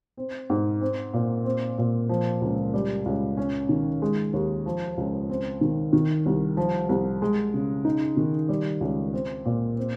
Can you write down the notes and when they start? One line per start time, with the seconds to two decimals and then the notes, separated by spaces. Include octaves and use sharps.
0.17 C4
0.50 G#2
0.81 C4
1.13 A#2
1.45 C4
1.78 A#2
2.09 F3
2.41 C#2
2.74 G3
3.06 C#2
3.37 C#4
3.69 D#3
4.02 G#3
4.33 D#2
4.66 F3
4.97 C#2
5.29 C4
5.61 D#3
5.93 D#3
6.26 C2
6.57 F3
6.89 C2
7.22 G#3
7.54 C#3
7.85 D#4
8.17 D#3
8.49 G3
8.81 C#2
9.13 C4
9.45 A#2
9.77 C4